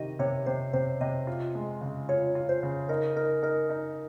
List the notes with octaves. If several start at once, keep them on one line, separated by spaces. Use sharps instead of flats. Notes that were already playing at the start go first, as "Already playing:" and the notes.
Already playing: C3 D#3 G4 D#5
C3 C#5
C3 C5
C3 C5
C3 D#5
F4
G#3
C#3
F4 C#5
F4
C5
C#3
D#4 A#4
D#4 A#4
D#4 A#4
D#4